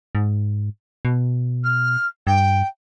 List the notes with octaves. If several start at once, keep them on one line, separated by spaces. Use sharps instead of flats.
G#2
B2
F6
G2 G5